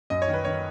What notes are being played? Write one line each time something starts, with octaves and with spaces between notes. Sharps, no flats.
F#2 D#5
C#5
D#3
B4
D#3 C#5